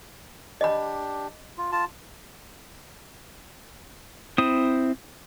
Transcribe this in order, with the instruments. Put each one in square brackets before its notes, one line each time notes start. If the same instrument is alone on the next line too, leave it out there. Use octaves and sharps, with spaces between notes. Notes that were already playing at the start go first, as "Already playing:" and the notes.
[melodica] D4 G4 [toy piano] D#5 B5
[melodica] F4
F4 A5
[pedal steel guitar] C4 E4 C5 D#6